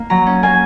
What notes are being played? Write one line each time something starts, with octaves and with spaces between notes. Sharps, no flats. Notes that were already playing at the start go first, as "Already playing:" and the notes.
Already playing: A#3
F#3 A#5
C#4
A#3 G#5